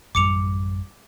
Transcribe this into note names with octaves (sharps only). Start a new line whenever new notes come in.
A1 F#2 G3 D6 C#7 F7